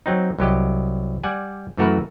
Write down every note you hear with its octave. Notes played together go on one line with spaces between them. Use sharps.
F#3 C4 D#4
C2 F#3 G4 D#5
G3 D5 F#5 G#5
F#2 E3 A3 F#4 A#4 B4